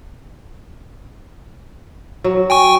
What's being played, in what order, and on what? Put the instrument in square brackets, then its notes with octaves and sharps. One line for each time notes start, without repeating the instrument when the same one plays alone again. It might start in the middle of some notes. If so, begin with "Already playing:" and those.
[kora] F#3
[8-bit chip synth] G5 G#5 C#6